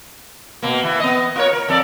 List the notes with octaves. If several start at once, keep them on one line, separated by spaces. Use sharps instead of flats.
B2 A#3
E3 A#3
B3 D#5
F4 A#4 C#5
A#4
F2 A4 D5